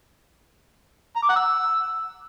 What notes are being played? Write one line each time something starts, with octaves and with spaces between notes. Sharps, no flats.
A#5
D6
F#5
E6